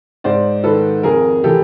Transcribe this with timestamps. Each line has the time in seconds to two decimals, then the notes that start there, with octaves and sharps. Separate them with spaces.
0.24 G#2 C5 D5
0.64 D#3 A4 B4
1.03 F2 G#4 A#4
1.44 C3 E3 G4 A4